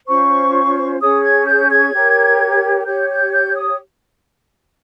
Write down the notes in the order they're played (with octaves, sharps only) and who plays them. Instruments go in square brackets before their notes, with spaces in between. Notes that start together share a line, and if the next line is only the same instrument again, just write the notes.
[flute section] C#4 F4 C5 C#6
C#4 G#4 C#5 D#6
G#6
G6
G#6
G4 A#4 C#5
G4 C#5 G6
G6
G6
D#6